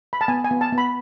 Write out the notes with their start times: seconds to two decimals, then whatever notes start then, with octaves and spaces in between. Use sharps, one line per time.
0.13 B5
0.21 A5
0.28 B3 G#5
0.45 G#5
0.51 B3
0.61 A5
0.72 B3
0.78 B5